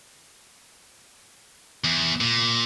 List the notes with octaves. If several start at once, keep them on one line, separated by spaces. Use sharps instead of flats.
E2
A#2